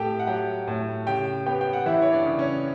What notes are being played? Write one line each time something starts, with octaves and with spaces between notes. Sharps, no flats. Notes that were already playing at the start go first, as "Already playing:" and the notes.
Already playing: A2 A3 G4 G5 A5
F#5
F#3 G4 G5
A2
C#3 G4 G5
B3 G4 G5
G5
F#5
E3 E4 E5
C#5
D4 D5
C#3
C#4 C#5